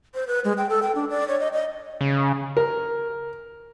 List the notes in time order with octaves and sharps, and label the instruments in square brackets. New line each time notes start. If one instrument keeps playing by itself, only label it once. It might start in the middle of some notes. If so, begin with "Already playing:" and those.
[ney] C5
B4
G#3
G5
A4
G5
D4
D5
C#5
D#5
D#5
[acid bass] C#3
[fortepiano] A#4